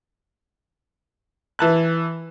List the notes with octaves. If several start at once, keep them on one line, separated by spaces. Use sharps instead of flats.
E3 A5 F#6